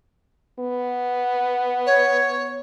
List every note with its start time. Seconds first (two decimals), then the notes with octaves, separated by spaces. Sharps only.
0.59 B3
1.86 C#5